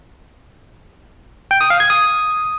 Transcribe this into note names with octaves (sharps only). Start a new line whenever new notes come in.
G5
D#6
F5
G#6
D#6